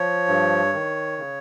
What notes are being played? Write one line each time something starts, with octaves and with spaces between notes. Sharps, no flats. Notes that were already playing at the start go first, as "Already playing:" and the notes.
Already playing: F3 C#5
G2
D#3
C#3